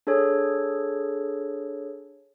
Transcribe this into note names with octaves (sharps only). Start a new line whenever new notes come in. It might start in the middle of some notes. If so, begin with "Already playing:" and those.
D4 G#4 A4 C#5